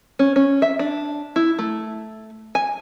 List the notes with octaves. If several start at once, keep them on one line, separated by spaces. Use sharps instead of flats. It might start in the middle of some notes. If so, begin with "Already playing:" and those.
C#4
C#4
E5
D4
E4
A3
G#5